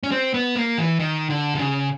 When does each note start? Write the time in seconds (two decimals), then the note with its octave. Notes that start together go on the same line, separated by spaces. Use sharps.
0.03 C#4
0.12 C4
0.34 B3
0.56 A#3
0.78 E3
1.00 D#3
1.30 D3
1.54 C3
1.59 C#3